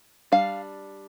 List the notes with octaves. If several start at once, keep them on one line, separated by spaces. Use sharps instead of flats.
G3 D4 F5